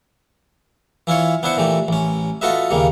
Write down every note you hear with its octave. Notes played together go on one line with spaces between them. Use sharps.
E3 E4 F4 C#5
B3 D4 E4 C5 F#5
A#2 E3 A3 G4
A1 C#4
F4 F#4 A4 B4 D#5 E5
D#2 C#3 G3 A#3